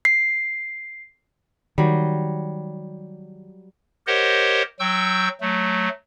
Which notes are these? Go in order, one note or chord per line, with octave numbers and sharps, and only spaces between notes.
C7
D#3 F#3 G3
G4 A#4 C5 C#5 D#5 F#5
F#3 G5 C#6 E6 G6
F#3 A3